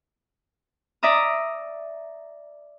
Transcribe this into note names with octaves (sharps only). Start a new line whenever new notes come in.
D5 E5 A#5 D#6